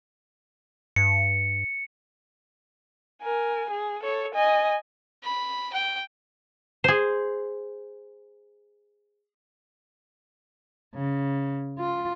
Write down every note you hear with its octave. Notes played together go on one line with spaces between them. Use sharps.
G2 C#7
A#4 G#5
G#4
A4 C#5
D#5 G#5
B5
G5
G#4 C5
C#3
F4